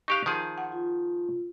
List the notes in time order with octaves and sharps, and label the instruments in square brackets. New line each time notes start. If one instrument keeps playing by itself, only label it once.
[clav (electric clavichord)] D#4 G4 F5 [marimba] C#6 F#6
[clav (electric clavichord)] D#3 F3 G#4
[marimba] F#5
[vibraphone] F4